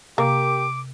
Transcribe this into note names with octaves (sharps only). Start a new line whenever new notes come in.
C3 A#3 G4 D6